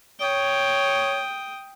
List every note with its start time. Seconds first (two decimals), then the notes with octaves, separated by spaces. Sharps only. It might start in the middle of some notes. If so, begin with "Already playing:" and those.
0.20 C#5 G5 D#6